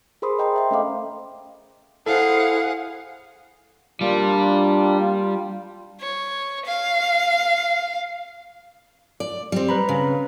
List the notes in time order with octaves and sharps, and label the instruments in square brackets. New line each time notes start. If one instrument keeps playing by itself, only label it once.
[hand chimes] G#4 A#4 C5 B5 C6 D#6
D#5 G5 A#5 C6
C5 E5 G5
A3 C#4 A4 D#5 F5 D6
[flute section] E4 C5 [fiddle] G#4 F#5 [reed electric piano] A4 [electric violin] F5
[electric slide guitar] G3 [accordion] A#3 D4 F4
[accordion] F4
[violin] C#5
F5
[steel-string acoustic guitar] D5
G3 C4
[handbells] B4 A#5 B5
[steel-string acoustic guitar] C#3